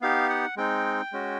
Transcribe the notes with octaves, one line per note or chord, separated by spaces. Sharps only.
B3 D#4 G4 F5
F#5
G#3 C4 D#4 G5
G#3 C#4 F#4